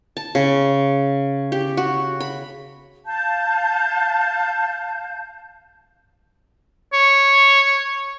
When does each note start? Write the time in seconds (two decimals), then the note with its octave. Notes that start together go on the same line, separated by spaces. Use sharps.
0.17 A5
0.35 C#3
1.52 G4
1.77 F#4
2.20 B5
3.06 F5 A5 G6
6.93 C#5